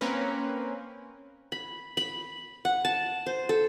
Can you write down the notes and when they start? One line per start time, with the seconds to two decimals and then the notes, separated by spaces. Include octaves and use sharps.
0.01 A#3 C4 C#4 A#4 B4
1.52 B5
1.97 B5
2.65 F#5
2.85 A5
3.26 C5
3.49 A4